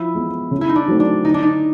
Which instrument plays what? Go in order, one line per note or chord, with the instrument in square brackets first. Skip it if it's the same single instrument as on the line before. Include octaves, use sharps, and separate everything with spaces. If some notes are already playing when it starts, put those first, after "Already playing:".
Already playing: [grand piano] F3 [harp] E4
[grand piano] G#3 B3
C#3
[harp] E4
D#4
D4
[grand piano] F#3 A3 C4
[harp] D4
[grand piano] D3 [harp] D#4
[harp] D4
D#4